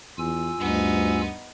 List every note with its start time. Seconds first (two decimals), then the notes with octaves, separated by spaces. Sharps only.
0.18 E2 F4 G#5 E6
0.59 D2 G2 B3 D#4